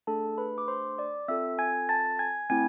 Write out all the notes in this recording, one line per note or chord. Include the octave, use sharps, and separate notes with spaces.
A3 D4 G#4 A4 A5
B4 B5
D6
C5 C6
D5 D6
C4 F4 A4 E5 E6
G#5 G#6
A5 A6
G#5 G#6
A3 C4 E4 G#5 G#6